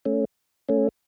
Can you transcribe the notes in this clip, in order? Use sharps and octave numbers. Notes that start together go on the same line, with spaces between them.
A3 C#4
A3 C#4